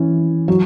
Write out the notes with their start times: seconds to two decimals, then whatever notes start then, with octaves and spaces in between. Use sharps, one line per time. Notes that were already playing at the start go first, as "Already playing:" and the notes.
Already playing: E3 C#4
0.48 F#3